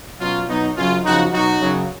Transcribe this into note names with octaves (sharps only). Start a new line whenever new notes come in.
B2 F#3 C#4 F4
B2 F#3 B3 D#4
F#2 C#3 F#3 C#4 F4
F#2 C#3 F3 D#4 F#4
B2 F#3 D#4 F#4
F#2 C#3 F#3